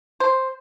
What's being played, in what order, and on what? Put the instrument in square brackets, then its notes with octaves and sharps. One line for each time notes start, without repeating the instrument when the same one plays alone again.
[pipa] C5